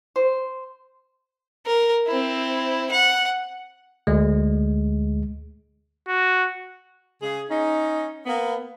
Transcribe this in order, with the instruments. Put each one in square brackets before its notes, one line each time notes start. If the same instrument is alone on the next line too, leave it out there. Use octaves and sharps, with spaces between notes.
[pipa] C5
[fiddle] A#4
C4 E4
F#5
[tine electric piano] D2 G#3
[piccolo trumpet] F#4
[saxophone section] C#3 G#4
C#4 D#4
A#3 B3